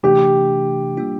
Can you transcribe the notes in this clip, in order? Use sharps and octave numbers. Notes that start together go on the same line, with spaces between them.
C3 E3 A3 D4 G4
G3 A#3 D4 F4